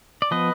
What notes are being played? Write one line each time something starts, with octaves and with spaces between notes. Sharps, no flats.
D5
F3 B3 B4 D#5